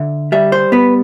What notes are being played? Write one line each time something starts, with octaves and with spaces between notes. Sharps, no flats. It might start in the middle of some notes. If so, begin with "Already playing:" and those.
Already playing: D3 E5
G3 E5
C5
B3 B4